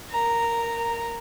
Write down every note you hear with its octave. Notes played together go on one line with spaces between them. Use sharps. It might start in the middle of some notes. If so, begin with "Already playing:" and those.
A#4 A#5